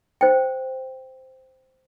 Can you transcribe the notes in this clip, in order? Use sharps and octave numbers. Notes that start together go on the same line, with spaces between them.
C5 G5